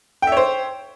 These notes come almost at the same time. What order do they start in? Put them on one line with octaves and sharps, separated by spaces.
G5 E5 C#5 C5